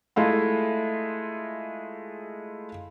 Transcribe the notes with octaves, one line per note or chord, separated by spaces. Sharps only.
G#3 A3 E4 F4